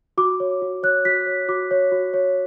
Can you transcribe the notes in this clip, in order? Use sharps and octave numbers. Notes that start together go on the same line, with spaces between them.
F#4 D6
C#5
F#4
C#5 F#6
F#4 B6
C#5
F#4 D6
C#5
F#4
C#5